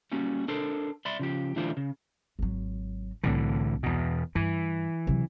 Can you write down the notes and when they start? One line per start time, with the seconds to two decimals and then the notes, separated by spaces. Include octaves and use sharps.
0.12 G3 A#3 C#4 F#4
0.48 D4 A4 A#4 C5
1.05 D5 E5 B5 C6
1.19 C#3 F3 G4
1.56 D2 E3 D4 F4 C5 D5
1.77 C#3
2.39 G#1 F#3
3.23 C2 A2 D3 E3
3.83 E2 B2
4.35 G2 E3
5.07 C3 F#3